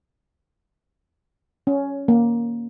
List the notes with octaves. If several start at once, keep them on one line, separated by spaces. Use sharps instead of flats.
C#4
A#3